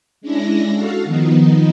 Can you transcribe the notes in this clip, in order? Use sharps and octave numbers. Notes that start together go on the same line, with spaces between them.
G#3 C#4 D4 E4 A#6
F#4 A4 F5
D#3 F3 B3 D#4